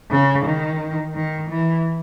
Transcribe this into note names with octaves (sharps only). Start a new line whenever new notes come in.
C#3
D#3
D#3
E3